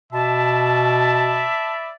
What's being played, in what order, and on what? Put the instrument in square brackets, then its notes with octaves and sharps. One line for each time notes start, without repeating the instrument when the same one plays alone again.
[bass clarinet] B2 [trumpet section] D5 E5 B5 [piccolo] A5